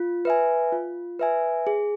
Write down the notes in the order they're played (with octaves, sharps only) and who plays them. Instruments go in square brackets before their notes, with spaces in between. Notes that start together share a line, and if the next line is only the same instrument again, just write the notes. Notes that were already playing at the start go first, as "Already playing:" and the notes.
Already playing: [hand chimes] F4
B4 E5 G#5
F4
B4 E5 G#5
G#4